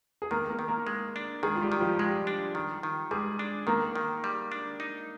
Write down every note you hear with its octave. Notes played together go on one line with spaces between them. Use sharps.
G#4
D#3 A#3 A#4
A#3 A#4
D#3
A#3 A#4
G#3
D4
D#3 G#3 G#4
F4
G3 G4
D#3
F3 F4
G3 G#3 G4
D4
D#3
D#3
G3 G#3 G#4
D4
D#3 A#3 A#4
D#3
G3
D4
D#4